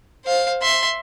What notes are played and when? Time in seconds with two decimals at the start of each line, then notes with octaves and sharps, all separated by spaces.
0.25 C5 F5
0.63 E5 C6